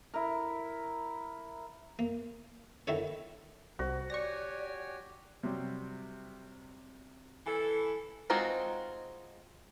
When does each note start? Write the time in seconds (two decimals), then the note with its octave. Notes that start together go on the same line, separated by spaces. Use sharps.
0.14 E4 A#4
1.99 A#3
2.87 D3 D#3 D4 E4 A4 C#5
3.79 C2 F#4 C5
4.10 G4 C#5 D5 G#5 C#6 A#6
5.43 C3 F#3 G3
7.47 E3 A4 G#5
8.30 G#3 C4 D#4 F4 F#4